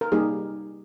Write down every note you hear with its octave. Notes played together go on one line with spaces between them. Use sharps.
A#4
G3 A#3 D#4 G4 G#4